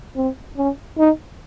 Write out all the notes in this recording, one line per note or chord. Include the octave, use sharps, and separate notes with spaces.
C4
C#4
D#4